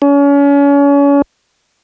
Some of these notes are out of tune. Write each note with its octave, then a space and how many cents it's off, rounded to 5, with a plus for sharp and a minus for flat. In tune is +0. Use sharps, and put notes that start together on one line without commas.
C#4 +35